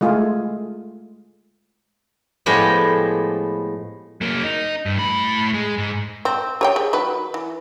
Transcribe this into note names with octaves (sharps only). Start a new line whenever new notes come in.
G#3 A3 F4 G#4
A2 F3 G#3 B3 G4
F#3 A#3
D#4
G2
A2 B5
G#3
G#2
C4
G4 C#5 G5
G#4
D#3 F#3 B4
E3